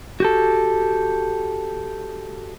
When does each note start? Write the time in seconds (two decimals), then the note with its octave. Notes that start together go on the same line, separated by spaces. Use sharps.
0.20 F#4 G4 A4